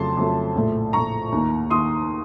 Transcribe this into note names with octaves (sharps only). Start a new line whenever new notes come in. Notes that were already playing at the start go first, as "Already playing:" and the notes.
Already playing: F2 C#3 F#3 A3 A5 C6
F2 C#3 F#3 A3
A#1 A2 A3
A#1 A2 A3 A#5 C#6
D#2 D#3 A#3
D#3 A#3 C6 D#6